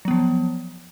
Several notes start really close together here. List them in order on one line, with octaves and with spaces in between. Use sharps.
F#3 B3 F3